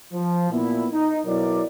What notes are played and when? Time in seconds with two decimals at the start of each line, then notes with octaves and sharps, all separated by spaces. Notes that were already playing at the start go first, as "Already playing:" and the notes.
0.14 F3
0.51 A#2 B3 E4
0.92 D#4
1.26 B2 F#3 E4 A#4 D5